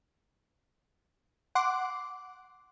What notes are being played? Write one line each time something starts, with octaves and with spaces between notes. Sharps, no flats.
F#5 C6 D6